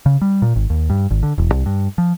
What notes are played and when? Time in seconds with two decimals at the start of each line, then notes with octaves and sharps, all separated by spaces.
0.06 C#3
0.22 G3
0.42 A#2
0.56 G#1
0.70 D#2
0.90 G2
1.11 G#1
1.23 D3
1.38 E1
1.52 C2
1.66 G2
1.98 F3